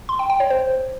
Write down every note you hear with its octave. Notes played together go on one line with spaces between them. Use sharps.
C6
G5
G5
C#5
C5